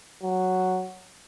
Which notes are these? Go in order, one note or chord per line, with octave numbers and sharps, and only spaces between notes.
F#3